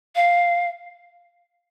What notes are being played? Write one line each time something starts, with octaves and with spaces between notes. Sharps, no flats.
F5